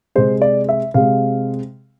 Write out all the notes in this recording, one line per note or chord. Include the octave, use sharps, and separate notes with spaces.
C3 G#3 C5
D5
E5
C3 G#3 F5